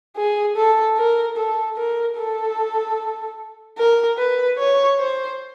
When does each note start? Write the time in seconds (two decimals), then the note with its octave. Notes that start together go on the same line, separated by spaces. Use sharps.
0.17 G#4
0.56 A4
0.97 A#4
1.37 A4
1.77 A#4
2.17 A4
3.78 A#4
4.18 B4
4.58 C#5
4.99 C5